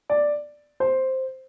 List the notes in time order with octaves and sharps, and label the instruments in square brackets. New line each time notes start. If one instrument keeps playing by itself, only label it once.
[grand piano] D5
C5